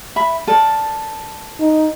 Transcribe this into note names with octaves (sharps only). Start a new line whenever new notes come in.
E5 B5
A4 A#4 D5
D#4